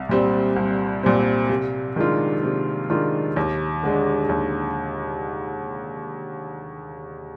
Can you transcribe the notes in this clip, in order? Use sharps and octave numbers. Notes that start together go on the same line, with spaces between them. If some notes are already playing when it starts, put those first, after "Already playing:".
Already playing: C2
A#2 G3 C4
C2
A#2 G3 C4
C3
D#3 G#3 D4 F4
C3
D#3 G#3 D4 F4
D#2
D3 G#3 D4
D#2